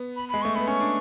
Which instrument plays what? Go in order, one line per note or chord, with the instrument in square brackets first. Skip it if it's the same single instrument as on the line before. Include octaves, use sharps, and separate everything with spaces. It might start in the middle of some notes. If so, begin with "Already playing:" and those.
Already playing: [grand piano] B3
[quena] B5
[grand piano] G#3 [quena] B5
[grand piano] A3 [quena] C#6
[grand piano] B3 [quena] B5
[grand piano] C#4 [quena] C#6
[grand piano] D4